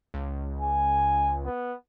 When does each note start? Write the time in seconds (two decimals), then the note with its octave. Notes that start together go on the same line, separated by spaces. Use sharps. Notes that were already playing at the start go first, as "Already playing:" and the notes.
0.14 C#2
0.61 G#5
1.45 B3